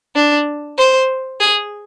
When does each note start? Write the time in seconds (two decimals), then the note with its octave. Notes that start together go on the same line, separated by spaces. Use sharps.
0.16 D4
0.78 C5
1.40 G#4